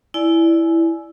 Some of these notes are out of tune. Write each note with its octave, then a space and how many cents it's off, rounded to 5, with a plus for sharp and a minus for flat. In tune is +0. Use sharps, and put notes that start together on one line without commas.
E4 +0 D5 +0 G#5 +20